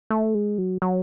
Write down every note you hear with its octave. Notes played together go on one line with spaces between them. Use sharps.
A3
G#3
F#3
F#3